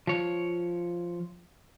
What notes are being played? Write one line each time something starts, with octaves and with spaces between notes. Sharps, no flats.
F3 C#5